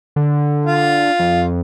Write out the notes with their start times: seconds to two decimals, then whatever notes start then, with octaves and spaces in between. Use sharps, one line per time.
0.16 D3
0.66 F4
1.19 F2